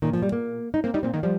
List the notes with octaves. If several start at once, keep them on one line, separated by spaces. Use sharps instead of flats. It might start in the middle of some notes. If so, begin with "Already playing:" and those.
A#2 D#3
F3
G3
A#3
D#4
A#3 C4
G3 D#4
A#2 C4
D#3 A#3
F3 G3